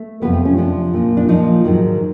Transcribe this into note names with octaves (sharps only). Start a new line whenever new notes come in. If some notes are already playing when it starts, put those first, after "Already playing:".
Already playing: A3
F2 C3 F3 B3
C4
C#4
F2 C3 F3 D4
A#2 F3
D4
A#2 F3 D#4
G#2 D#3 F#3